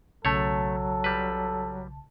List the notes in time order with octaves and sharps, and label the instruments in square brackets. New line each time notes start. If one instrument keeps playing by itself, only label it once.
[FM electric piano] B1 C#3 A5 [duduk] F#3 [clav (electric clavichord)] A3 C#5 [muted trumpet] A4
[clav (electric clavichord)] G3 B4